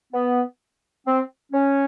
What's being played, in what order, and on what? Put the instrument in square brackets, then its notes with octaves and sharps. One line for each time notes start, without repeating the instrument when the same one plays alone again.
[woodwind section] B3
C4
C#4